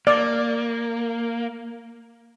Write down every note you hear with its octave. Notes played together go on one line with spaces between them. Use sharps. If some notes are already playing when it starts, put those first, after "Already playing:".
A#3 D5